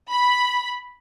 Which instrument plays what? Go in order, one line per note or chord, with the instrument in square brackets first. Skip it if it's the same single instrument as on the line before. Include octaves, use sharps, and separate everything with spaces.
[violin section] B5